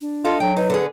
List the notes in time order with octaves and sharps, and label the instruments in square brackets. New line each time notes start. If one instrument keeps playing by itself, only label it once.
[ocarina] D4
[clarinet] F4 [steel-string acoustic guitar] A4 D#5 F5
[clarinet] F#3 [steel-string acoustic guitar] G5
[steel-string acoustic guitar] D#4 [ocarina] B4
[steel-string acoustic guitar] D3 B3 G#4